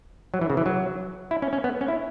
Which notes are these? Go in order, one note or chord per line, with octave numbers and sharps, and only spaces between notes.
F#3
E3
C#3
E3
F#3
E4
C#4
C#4
B3
C#4
E4